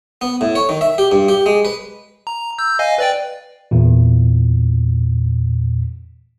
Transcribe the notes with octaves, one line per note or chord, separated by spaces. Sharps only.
B3
A2
C#5
D#3
E5
G4
G2
G4
G#3
B4
A#5
E6 G6
D#5 F5 G#5
B4 D5 G5
E2 A#2